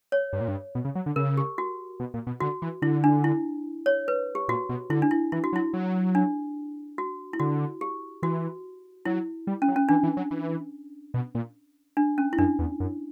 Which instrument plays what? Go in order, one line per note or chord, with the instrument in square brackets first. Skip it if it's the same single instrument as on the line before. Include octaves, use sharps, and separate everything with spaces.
[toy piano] C#5
[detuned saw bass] G2
A#2
G2
B2
C#3
F#3
D3
[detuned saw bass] C#3 [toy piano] A#4
[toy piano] G4
F#4
[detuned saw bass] B2
A#2
B2
[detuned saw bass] D3 [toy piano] F#4
[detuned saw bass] E3
[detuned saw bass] D3 [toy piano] E4
[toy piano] D4
E4
C#5
B4
G4
[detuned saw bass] A#2 [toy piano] F#4
[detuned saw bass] B2
[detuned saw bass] D3 [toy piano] E4
[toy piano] D4
E4
[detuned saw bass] E3 [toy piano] E4
[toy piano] F#4
[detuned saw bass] F#3
[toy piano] E4
[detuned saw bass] F#3
[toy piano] D4
F#4
E4
[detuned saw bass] D3 [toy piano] F#4
[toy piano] G4
[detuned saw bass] E3 [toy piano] F#4
[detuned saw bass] F#3 [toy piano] E4
[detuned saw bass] G3
[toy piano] C#4
[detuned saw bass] F#3
[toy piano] C#4
[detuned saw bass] E3 [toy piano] D4
[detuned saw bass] E3
F#3
E3
B2
A#2
[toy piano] D4
C#4
E4
[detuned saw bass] F#2 [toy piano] D4
[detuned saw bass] E2
F#2